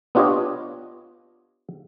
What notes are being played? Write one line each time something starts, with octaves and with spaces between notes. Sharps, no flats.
B3 D4 F4 G4 C#5 D#5